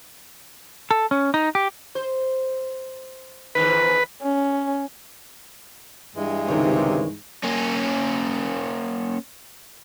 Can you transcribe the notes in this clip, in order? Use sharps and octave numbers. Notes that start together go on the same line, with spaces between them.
A4
C#4
D#4
G4
C5
E2 G#2 D#3 B4
C#4
G2 E3 G#3
C#2 C3 D#3 C#5
A#3 C#4